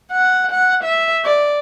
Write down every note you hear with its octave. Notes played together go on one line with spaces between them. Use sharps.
F#5
F#5
E5
D5